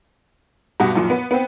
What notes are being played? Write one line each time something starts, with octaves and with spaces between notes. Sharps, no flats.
G2 B2 F#5
F#2 A#2 F3
B3
B3 C4